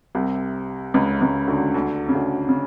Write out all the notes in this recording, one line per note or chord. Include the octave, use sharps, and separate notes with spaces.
C2 C3
C#2 C#3
C#2 C#3
D2 D3
D2 D3
C#3
D2 D3
C#3